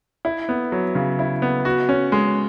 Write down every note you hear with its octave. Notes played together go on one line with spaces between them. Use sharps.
E4
B3
F#3
C#3
E4
B3
F#4
C#4
G#3